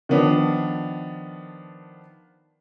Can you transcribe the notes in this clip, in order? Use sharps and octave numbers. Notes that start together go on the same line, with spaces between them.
D#3 F3 B3 D4